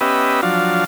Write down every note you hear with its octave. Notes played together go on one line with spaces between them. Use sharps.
B3 C#4 G4 B4 D#5 E5
F3 F#3 D4 F5